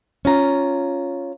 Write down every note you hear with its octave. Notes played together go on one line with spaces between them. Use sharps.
C#4 F4 A#5